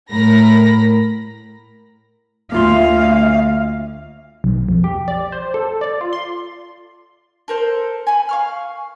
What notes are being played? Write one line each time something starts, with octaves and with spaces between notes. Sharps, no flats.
A2 A#4 B5 A#6
D2 A#3 F4 E5 F5 C6
B1
F2
G4
D5
C5
A4
D5
F4
C6
A4 A#4 C5
G#5 B5
F5 C#6 F6